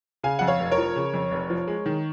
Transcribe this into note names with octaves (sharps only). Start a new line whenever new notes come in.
C#3 F5 G#5
F2 F#5
C#5 F5
F1
A#4 C#5
F3
C#3
F2
F1
F3
G#3
D#3